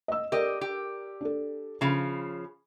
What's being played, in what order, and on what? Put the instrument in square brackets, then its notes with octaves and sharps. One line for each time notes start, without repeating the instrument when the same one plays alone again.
[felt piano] D#5 E6
[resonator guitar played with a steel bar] G4 D#5 [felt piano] A#4 D5
[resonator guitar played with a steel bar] G4
[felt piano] D4 A4
[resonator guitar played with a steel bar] C#3 F3 [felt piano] B5